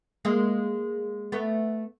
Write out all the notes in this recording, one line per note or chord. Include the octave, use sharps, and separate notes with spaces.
G#3 A#3
A3 B3